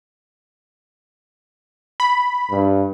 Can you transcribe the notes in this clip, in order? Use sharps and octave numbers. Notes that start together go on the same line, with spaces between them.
B5
G2